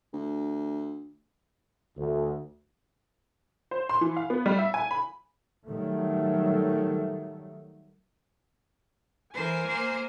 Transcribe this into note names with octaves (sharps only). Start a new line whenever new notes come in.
D2
D2
C5
C6
E3
F5
B3
G3
E5
G#5
B5
D#3 F#3 G3 A3
E3 A#4 C5 G#5
A#3 C5